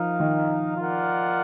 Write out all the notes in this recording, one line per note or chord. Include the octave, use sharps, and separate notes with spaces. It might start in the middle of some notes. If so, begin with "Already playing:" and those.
Already playing: F3 D#4 A#4 F5
D#3
F4 A#4 D5 F#5